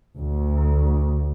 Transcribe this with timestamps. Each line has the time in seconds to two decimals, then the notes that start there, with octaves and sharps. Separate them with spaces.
0.18 D2